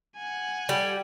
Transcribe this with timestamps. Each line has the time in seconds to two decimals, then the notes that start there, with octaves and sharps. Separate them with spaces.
0.16 F#5 G#5
0.69 G3